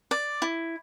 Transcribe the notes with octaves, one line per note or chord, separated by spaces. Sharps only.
D5
E4